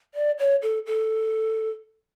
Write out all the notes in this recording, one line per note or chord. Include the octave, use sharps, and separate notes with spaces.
D5
C#5
A4
A4